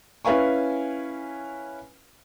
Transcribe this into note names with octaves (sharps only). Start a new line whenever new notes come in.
C#4 E4 B4 F5 G#5 C#6